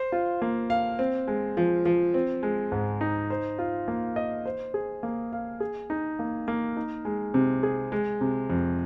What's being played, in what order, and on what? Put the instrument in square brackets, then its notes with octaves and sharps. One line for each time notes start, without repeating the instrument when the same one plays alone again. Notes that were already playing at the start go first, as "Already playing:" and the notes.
Already playing: [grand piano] C5
F4
A#3
F5
C4
G#3
F3
F3
C4
G#3
G#2
D#4
C5
F4
A#3
D#5
C5
G#4
A#3
F5
G#4
D#4
A#3
A#3
D#4
G#3
C3
G#4
G#3
C3
F2